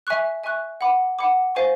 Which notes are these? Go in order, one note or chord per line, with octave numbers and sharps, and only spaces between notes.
E5 G#5 C#6 F#6
E5 G#5 C#6 F#6
F#5 B5 D6
F#5 B5 D6
C5 F5 G#5 C#6